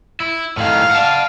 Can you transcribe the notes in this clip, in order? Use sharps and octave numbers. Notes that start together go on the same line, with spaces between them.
E4
A2 D#3 F5
F#5 A5